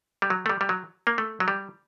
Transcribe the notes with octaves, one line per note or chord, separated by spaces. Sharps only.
G3
F#3
A3
G3
G3
F#3
A#3
A3
F#3
G3